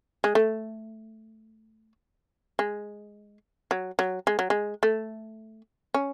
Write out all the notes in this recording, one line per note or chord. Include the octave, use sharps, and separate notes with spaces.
G#3
A3
G#3
F#3
F#3
G#3
F#3
G#3
A3
C#4